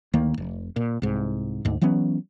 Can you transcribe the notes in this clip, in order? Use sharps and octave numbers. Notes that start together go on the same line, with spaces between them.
D2 D#3 A#3
F1
A#2
C2 G#2
D2 G#2
E3 F#3 B3 C#4